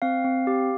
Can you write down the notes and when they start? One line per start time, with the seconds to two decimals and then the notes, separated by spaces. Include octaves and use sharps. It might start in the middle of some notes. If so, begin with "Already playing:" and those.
0.02 C4 F5
0.24 C4
0.47 G4